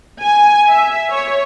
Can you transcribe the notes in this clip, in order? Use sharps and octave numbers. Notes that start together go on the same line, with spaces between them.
G#5
E5
C#5